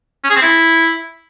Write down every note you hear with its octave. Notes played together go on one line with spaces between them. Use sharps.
C#4
G#4
C4
E4